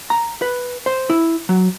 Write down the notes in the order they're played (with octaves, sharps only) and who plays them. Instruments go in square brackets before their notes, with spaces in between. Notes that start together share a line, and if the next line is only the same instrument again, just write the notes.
[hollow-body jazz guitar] A#5
B4
C5
E4
F#3